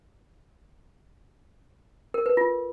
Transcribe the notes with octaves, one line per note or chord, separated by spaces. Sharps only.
A#4
B4
F4